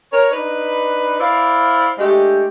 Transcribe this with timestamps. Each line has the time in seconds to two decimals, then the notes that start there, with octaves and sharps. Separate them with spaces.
0.13 A#4 C#5
0.32 D4 D#4 B4
1.20 E4 C5 D5 F5
1.99 G#3 A3 D4 G4